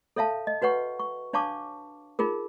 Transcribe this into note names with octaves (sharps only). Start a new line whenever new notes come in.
A4 C#5 E5 F5 A5
D#5
F#4 B4 C#5 F#5 C#6
C#6
D4 C#5 F5 A5 C#6 D6
D#4 F4 G#4 A#4